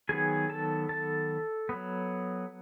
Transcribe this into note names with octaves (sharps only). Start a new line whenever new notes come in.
D#3 F#3 B3 G#4 G#5
A4 A5
A4 A5
F#3 B3